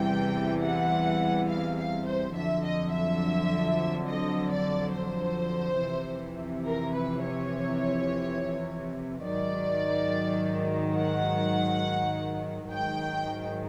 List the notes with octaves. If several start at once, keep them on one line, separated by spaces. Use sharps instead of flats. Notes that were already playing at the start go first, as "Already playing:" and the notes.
Already playing: E2 C3 E3 G3 G5
F#5
F5
F5
C5
F2 D3 F#3 E5
D#5
E5
D#5
D5
C5
F2 C3 E3
A#4
B4
C#5
G#2 D#3 F#3 D5
F#5
G#2 D#3 F#3 G5